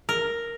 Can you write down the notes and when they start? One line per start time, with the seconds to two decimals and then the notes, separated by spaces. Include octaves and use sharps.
0.09 A#4